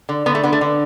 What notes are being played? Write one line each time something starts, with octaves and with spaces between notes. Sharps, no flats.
D3
D3 B3
A3
D3 B3
A3
D3